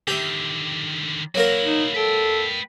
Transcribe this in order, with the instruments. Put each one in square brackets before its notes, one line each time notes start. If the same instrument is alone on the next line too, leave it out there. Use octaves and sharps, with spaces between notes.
[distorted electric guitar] D3 D#3 [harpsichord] G4 E5
[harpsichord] F#3 A#3 A#4 [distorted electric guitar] E4 F#4
[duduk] D#4
[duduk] A4 [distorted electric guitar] B4 G5